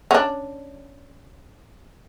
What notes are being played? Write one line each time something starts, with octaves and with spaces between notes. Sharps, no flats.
C#4 D4